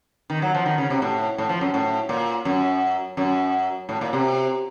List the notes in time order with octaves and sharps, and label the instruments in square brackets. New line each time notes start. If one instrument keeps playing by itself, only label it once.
[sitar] D#3
F#3
F3
D#3
C#3
C3
A2
A2
F3
F#2
A2
A#2
F#2
F#2
A2
A#2
C3